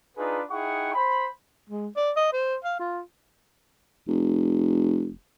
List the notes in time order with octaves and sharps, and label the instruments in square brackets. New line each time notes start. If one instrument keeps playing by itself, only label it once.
[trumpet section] D4 D#4 F4 G#4 B4
D#4 E4 G#4 F#5 G5 C#6
C5 B5
[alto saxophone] G#3
D5
D#5
C5
F5
F4
[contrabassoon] F1